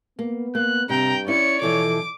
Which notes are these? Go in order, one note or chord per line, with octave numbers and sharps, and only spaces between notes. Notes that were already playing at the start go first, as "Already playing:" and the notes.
A#3 B3
A#3 F#6
G2 C3 G5 A#5
B3 C#4 E4 C#5 D5 C#7
B2 E3 F3 A4 D6